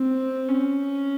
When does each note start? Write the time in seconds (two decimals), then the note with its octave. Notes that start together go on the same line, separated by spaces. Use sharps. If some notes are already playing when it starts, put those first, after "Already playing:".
Already playing: C4
0.48 C#4